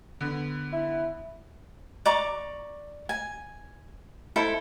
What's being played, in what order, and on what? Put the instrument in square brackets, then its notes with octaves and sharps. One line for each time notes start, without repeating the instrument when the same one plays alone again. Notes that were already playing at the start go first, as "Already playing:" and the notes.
[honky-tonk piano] D3 B3
[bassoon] E4
[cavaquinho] D5 A#5 C#6 D6
G#5
E4 A4 C5